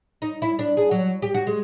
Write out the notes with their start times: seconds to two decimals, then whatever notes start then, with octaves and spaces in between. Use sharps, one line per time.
0.22 D#4
0.42 E4
0.59 D4
0.77 G#4
0.91 F#3
1.22 G4
1.34 F#4
1.47 G#3